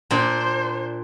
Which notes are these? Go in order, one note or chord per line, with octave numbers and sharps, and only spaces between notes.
A#2 D4 C5